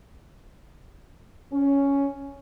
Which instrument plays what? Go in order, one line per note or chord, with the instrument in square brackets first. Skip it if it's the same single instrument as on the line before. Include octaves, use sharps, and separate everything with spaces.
[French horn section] C#4